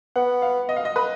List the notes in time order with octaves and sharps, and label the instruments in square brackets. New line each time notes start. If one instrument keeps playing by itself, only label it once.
[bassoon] B3 [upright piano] F#5
[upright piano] F5
D#5
F5
D#5
B4